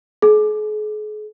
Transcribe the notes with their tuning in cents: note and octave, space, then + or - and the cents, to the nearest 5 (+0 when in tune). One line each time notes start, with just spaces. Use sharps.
G#4 +40